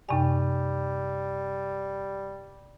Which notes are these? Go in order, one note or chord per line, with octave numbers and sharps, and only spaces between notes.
F#2 C3 G3 G#5